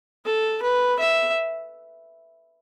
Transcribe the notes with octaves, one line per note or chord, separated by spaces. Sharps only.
A4
B4
E5